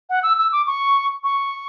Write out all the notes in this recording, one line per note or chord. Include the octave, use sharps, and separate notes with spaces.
F#5
E6
E6
D6
C#6
C#6